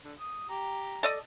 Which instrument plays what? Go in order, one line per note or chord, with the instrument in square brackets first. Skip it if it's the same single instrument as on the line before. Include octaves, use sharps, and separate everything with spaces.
[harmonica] D3
D#6
G4 A#5
[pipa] A4 D5 D#5